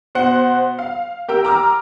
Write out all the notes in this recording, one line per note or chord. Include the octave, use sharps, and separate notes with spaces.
B2 C5 F#5 C#7
F5
G4 A#4 G5 E6
A#5 D6 E6 F6